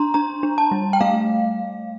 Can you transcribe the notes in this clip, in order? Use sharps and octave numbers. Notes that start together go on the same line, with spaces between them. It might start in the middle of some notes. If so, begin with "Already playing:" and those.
Already playing: D4 A#5 C6
D4 A#5
D4
A5
G3
G5
A3 F5